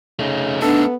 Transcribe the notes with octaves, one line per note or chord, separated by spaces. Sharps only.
C#3 A3 D#4
B3 D4 A4